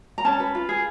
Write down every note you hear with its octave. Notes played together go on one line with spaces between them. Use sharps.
A#5
C#4 A5
B4
F4
G#4